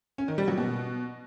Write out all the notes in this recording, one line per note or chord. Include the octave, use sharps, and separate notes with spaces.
C#4
D#3
G3
F#3
B2